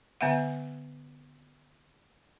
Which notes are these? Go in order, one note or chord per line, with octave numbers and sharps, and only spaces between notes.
D3 B3 E5 F#5